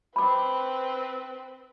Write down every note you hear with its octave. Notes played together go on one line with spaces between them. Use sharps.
C4 B4 B5 D6